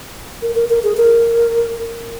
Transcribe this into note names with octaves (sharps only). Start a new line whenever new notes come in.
A#4
A#4
A#4
G#4
A#4